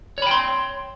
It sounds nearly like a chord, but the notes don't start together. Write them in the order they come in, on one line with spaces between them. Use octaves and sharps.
C#5 B5 G5 C6